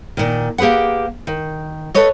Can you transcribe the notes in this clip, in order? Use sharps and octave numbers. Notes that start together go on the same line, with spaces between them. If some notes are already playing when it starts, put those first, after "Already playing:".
A#2 D#3
A#3 G4 G#4 B4 F#5
D#3
A4 B4 C#5 D#5